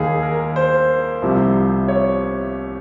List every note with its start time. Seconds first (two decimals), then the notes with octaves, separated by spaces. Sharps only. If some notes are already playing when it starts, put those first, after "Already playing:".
Already playing: D#2 D#3 G#4
0.23 A#4
0.56 C5
1.22 C2 C3 F3
1.88 C#5